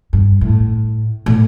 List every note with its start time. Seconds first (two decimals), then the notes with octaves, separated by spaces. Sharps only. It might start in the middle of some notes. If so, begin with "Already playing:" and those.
0.13 G2
0.41 A2
1.26 A2